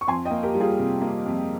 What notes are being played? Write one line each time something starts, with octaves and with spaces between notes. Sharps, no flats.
C#6
F2 G#5 C6
D#5 G5
A#3
G4 A#4
G3
F4 G#4
C3
A#3
F2